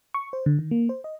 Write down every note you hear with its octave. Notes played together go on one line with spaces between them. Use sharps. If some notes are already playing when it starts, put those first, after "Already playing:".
C#6
C5
D3
D#3
A#3
C5
D#5